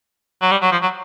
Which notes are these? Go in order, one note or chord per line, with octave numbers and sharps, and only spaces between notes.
F#3
G3
F#3
F3
F#3